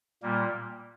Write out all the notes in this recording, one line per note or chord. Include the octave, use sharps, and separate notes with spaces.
A#2 G3 A#3